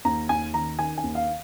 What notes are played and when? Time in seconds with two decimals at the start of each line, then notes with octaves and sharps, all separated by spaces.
0.05 D#2 A#5
0.29 D#2 G#5
0.54 D#3 A#5
0.79 D#3 G#5
0.98 G#5
1.03 D#2
1.15 F5